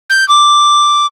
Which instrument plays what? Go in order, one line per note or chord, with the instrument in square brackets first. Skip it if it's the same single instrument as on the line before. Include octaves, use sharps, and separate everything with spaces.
[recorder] G6
D6